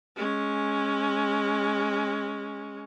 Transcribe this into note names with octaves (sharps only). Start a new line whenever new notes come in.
G#3 C#4